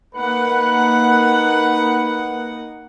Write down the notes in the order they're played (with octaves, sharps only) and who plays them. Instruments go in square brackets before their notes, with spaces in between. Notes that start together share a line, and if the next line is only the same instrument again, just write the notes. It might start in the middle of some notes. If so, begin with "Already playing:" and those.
[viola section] A#3 D#4 F#5 [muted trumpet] B4